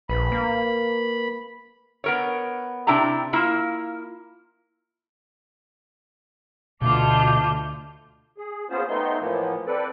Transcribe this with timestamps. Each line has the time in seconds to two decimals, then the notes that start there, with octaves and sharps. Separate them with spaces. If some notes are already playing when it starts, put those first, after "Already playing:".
0.09 A#1 B4 B5
0.32 A#3
2.04 B3 A#4 C#5
2.87 C3 D4 E4 G5 A#5
3.33 A#3 E4 F4
6.82 D2 B2 F4 A5 D6 G6
8.38 G#4
8.70 A#3 B3 C#4 F4 G#4 C5
8.88 A3 B3 C4 D#4 C6
9.19 A2 E3 F3 A#3 B3
9.67 C4 A4 B4 D5